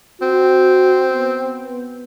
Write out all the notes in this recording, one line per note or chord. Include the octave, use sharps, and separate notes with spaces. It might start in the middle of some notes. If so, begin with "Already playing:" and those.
C4 F#4
B3